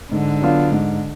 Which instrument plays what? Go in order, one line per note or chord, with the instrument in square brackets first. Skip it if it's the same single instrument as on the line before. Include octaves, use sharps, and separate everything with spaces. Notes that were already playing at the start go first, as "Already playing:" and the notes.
[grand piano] G#2 [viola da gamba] D3
[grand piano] F#3 B3 D4 F4
G#2